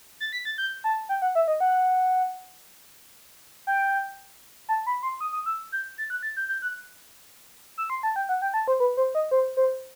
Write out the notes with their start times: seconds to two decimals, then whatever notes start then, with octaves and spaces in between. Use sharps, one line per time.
0.20 A6
0.33 B6
0.45 A6
0.58 G6
0.84 A5
1.09 G5
1.22 F#5
1.35 E5
1.48 D#5
1.60 F#5
3.67 G5
4.69 A5
4.87 B5
5.03 C6
5.21 D#6
5.33 D#6
5.46 E6
5.72 G6
5.98 A6
6.10 F#6
6.23 A6
6.37 G6
6.49 G6
6.62 F#6
7.78 E6
7.90 C6
8.03 A5
8.16 G5
8.29 F#5
8.42 G5
8.54 A5
8.68 C5
8.80 B4
8.97 C5
9.15 D#5
9.31 C5
9.57 C5